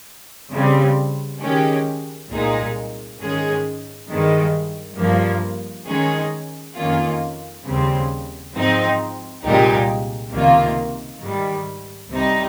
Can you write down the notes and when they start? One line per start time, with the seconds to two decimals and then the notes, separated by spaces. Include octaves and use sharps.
0.52 C#3 G3 C4
1.40 D#3 G#3 C#4 G4
2.30 C2 A#2 G#3 D#4 G#4
3.19 G#2 D#3 G#3 C#4 G#4
4.09 G2 D#3 G#3
4.97 G2 F3 A#3
5.87 D#3 G#3 C#4 G#4
6.76 F2 D#3 A#3 C#4 F4
7.66 D#2 C#3 G3 C4
8.55 G#2 F3 C4 D#4
9.44 C2 A#2 G#3 D#4 G4
10.32 C#2 C3 D#3 A#3 F4
11.22 G#2 D#3 G3
12.11 C2 C3 G3 C4 D#4